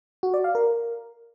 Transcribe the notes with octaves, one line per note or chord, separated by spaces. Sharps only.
F#4
D5
F5
A#4